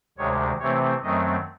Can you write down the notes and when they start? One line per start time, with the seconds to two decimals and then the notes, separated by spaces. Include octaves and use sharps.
0.18 D2 C3 D#3 G#3 C#5
0.60 C3 E3 A3 C4 C#5
1.02 F#2 D#3 F#3 A3 C4 D#5